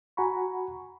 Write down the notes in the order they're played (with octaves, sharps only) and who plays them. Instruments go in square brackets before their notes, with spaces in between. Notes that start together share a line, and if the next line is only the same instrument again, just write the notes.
[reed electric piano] F#4 F#5 G#5 A#5 B5 C#6